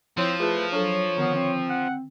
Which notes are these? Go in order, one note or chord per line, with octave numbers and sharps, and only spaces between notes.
F3 C4 E4 C#5
A3 F4 G#4 B4
F#3 D4 A4 C#5
D3 D#3 B3
C4
F#5